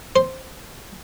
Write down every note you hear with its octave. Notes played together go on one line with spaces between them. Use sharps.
C5